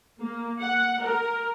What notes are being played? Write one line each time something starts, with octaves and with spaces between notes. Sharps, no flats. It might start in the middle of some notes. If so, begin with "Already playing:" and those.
A#3
F#5
A#4